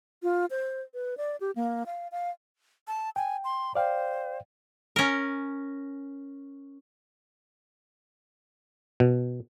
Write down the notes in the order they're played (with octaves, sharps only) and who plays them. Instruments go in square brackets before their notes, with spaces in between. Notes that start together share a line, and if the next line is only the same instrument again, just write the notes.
[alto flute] F4
C5
B4
D5
G4
A#3
F5
F5
[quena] A5
[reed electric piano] G5 [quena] G#5
[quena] C6
[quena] C5 [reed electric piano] D5 F5 G5
[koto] C#4 A#4
[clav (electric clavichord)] B2